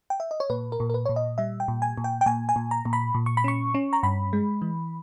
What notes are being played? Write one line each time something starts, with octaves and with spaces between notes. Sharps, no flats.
G5
E5
D#5
C#5
A#2 B4
A#4
A#2
A#4
B4
A#2 C#5
D#5
G3 E5
G5
A#2
G#5
A#2
G5
G5
A#2 G#5
G#5
A#2
A#5
A#2
B5
A#2
C#6
B5
C#4 C#6
C#4
A#5
G2 B5
G#3
E3